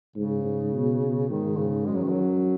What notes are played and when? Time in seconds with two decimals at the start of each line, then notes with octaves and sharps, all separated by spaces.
0.16 G#2 C#3
0.44 G#2
0.73 B2
1.01 B2
1.29 G#2 D#3
1.58 G#2 C#3
1.86 F#2 G#3
1.95 F#3
2.02 D#3
2.10 F#3